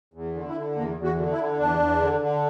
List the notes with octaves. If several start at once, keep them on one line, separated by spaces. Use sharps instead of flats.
E2
D3
E4
D3
E2 A#3
E2
F#4
D3
E4
D3
E2 D4
E2
D3
D3